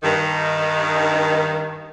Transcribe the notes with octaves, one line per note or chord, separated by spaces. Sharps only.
G2 D#3